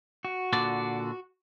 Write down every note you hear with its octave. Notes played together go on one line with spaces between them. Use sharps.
F#4
A#2 D3 D5